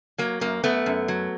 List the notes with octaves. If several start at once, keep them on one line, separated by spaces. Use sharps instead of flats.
F#3 A#3
F#2 A#3
F#2 A3 B3
F#2
F#3